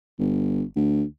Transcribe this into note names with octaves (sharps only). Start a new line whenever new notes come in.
G1
D2